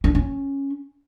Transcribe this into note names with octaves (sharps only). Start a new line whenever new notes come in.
D4
C#4